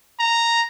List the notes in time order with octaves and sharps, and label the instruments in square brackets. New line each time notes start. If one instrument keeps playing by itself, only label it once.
[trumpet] A#5